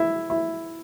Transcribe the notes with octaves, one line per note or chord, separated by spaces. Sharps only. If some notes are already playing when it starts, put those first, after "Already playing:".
Already playing: E4
E4